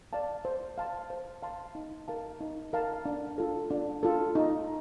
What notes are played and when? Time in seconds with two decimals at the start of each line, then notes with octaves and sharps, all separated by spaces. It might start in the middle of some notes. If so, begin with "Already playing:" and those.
0.13 D5 F5 A5
0.45 C5
0.78 F5 A5 C6
1.10 C5
1.43 F5 A5 C6
1.75 D#4
2.08 A#4 F5 A5
2.41 D#4
2.73 A#4 F5 A5
3.05 D4
3.38 F4 A4
3.71 D4
4.03 F4 A4
4.35 D#4